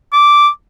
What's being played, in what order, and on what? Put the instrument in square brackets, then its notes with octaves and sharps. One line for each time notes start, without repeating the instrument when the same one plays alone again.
[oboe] D6